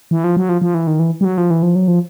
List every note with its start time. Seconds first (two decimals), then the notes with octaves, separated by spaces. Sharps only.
0.11 E3
0.24 F3
0.37 F#3
0.49 F3
0.62 F3
0.74 E3
0.87 D#3
0.99 E3
1.21 G3
1.25 F#3
1.38 F3
1.50 E3
1.63 F3
1.75 F#3
1.88 F3